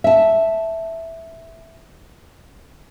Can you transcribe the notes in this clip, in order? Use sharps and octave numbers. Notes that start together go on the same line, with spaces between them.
E5 A5